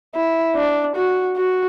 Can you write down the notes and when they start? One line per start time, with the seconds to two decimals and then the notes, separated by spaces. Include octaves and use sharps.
0.15 E4
0.56 D4
0.96 F#4
1.37 F#4